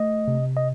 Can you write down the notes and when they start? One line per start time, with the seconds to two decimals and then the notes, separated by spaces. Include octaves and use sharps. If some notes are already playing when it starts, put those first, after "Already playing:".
Already playing: A3 D#5
0.28 C3
0.57 D#5